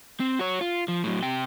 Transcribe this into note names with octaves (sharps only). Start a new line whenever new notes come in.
C4
F#4 C#5
F4
F3
A2 F#3
C3 G5